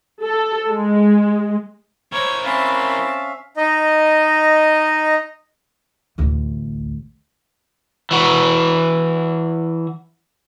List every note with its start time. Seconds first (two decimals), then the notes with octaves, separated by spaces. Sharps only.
0.24 A4
0.71 G#3
2.12 E4 A#4 C5 C#5
2.44 C4 C#4 E5 F5 A5 B5
3.57 D#4 D#5
6.18 A1 D2
8.11 E3 F#4